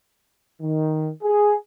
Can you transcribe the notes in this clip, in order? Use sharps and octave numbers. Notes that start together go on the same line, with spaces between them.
D#3
G#4